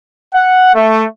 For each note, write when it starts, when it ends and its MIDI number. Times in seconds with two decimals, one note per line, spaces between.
0.34 0.72 78
0.75 1.05 57